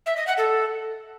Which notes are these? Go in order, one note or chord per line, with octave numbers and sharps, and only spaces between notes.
E5
D#5
F#5
A4